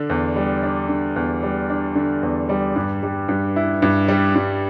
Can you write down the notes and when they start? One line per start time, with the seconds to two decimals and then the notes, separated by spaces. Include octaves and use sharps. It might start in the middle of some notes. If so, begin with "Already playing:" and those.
Already playing: D3 D4
0.10 E2
0.36 G3
0.63 D4
0.89 D3
1.16 E2
1.43 G3
1.70 D4
1.95 D3
2.23 E2
2.49 G3
2.76 G2
3.03 G3
3.29 G2
3.56 E4
3.82 G2
4.08 G3
4.35 G2